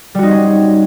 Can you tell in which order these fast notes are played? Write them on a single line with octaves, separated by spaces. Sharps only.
G3 F#4 D#4 C4 C#4